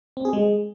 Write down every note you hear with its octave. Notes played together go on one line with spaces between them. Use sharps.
C4
G#4
G#3